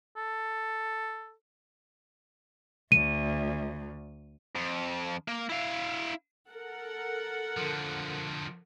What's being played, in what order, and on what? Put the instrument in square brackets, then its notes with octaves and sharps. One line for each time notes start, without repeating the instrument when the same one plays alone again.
[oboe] A4
[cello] D2 [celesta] D#7
[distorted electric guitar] F2
A#3
E4 F5
[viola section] A4 A#4 F#5
[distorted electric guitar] D3 F3